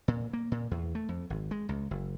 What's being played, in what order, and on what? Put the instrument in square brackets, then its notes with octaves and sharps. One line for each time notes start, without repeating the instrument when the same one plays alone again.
[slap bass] A#2
A#3
A#2
E2
A3
F2
G#1
G#3
C#2
F#1